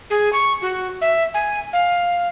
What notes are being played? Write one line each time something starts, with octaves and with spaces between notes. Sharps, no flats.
G#4
C#6
F#4
E5
G#5
F5